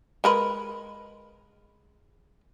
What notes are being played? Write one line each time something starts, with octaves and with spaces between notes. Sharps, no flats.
G#3 A#4 B4